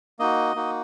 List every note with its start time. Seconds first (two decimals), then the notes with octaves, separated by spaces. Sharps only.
0.19 A#3 D#4 F#4 D#5
0.56 A#3 D#4 F#4